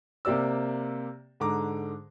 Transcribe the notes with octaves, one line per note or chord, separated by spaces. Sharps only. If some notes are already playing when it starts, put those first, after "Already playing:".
C3 A#3 G4 D5 E6
G#2 D3 A#5 D6